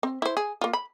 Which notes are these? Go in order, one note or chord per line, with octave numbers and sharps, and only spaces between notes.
C4
E4 C5
G#4
A#3 F4
B5